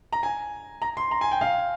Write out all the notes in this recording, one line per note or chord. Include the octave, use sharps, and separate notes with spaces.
A#5
G#5
A#5
C6
A#5
G#5
G5
F5